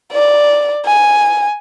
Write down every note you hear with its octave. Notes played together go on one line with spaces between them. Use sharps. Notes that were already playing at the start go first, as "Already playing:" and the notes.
D5
G#5